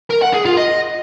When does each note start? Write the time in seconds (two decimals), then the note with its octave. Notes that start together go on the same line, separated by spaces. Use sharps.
0.10 A#4
0.22 F#5
0.33 G#4
0.45 F4
0.57 D#5